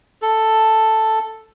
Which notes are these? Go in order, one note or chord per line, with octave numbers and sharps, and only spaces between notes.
A4